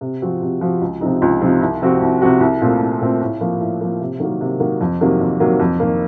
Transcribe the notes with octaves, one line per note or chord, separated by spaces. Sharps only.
C3
F3 C4 F#4
C3
F3 C4 F#4
C#2
C3 F3 C4 D#4
C#2
C3 F3 C4 D#4
C2
C3 F3 C4 F#4
C2
C3 F3 C4 F#4
C2
A#2 A3 C4 F4
C2
A#2 A3 C4 F4
A2
F3 A#3
A2
F3 A#3
C3
D#3 F#3 A#3
C3
D#3 F#3 A#3
F2
C3 D#3 F#3 A#3
F2
C3 D#3 F#3 A#3
F2
D#3 A#3